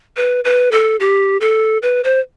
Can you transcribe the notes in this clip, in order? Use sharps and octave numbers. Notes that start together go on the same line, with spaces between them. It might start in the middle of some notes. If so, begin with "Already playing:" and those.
B4
B4
A4
G4
A4
B4
C5